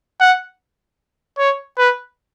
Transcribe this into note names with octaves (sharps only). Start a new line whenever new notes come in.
F#5
C#5
B4